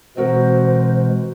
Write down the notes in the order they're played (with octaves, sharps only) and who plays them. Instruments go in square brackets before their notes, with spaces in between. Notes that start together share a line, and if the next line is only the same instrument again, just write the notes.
[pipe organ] B2 E3 G#3 [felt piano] C4 F#4 A#4 [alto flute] C5